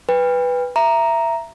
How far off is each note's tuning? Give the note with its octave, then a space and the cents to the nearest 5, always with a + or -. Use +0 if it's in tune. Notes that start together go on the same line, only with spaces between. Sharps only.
B4 +0 G5 +40
E5 +15 A#5 +0